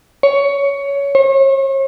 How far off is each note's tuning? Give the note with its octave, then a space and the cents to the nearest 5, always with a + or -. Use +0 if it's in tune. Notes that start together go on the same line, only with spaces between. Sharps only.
C#5 +15
C#5 -40